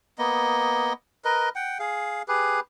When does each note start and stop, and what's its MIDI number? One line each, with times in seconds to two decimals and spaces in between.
0.19 0.93 58
0.19 0.93 59
0.19 0.93 75
1.25 1.49 70
1.25 1.49 71
1.25 1.49 75
1.56 1.78 78
1.56 1.78 79
1.79 2.22 68
1.79 2.22 77
2.28 2.60 67
2.28 2.60 68
2.28 2.60 71